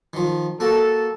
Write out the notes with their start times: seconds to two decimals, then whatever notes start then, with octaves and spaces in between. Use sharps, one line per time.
0.13 D#3 F3
0.60 A#3 F#4 A4